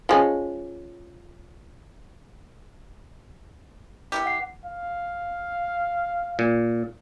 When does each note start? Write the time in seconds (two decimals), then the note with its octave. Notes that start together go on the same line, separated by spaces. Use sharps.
0.09 F3 G#3 C#4
4.12 B3 E4 G4
4.26 F#5 C7
4.65 F5
6.39 A#2